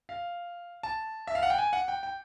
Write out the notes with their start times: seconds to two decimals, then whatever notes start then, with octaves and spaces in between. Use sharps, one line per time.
0.09 F5
0.83 A5
1.27 E5
1.35 F5
1.43 F#5
1.50 G5
1.58 G#5
1.73 F#5
1.88 G5
2.03 G5